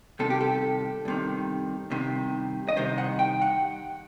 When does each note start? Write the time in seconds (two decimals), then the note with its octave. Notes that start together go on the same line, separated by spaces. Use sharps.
0.19 C2 C3 D#3 A4
0.30 G4
0.41 A4
1.05 C2 C3 D#3
1.91 C2 C3 D#3
2.69 D#5
2.76 C2 C3 D#3 C5
2.98 F#5
3.19 G5
3.42 F#5